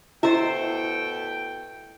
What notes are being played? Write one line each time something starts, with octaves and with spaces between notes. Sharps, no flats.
B2 A3 E4 C5 D#5 E5 G5